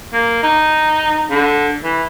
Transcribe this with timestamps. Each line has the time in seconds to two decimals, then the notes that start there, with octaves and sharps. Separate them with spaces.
0.13 A#3
0.43 D#4
1.31 D3
1.84 E3